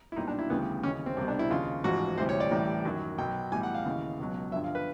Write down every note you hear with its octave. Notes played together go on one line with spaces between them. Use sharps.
E4
B1 A#2 G3 D#4
D4
E4
D2 C#3 E3 G3 B3
D#2 C#3 E3 C#4
C4
C2 B2 G3 C4
D4
E4
D#2 C#3 F3 F4
A1 G#2 F3 F#4
D2 C3 E3 G3 C5
C#5
D5
A1 A2 E3 G3
F#2 D#3 F#3
B1 B2 F#3 G5
B1 A2 E3 G3 G#5
F#5
F5
D#2 C#3 E3
C#2 B2 F#3
G2 D3 F3 E5
F5
B4